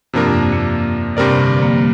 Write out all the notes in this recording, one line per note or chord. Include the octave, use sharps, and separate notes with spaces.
G2 C3 F3 A#3 D4 A#4
F2
A#3
G2 C3 G3 C4 A#4 D5
A#2
D3
F3
A#3
G3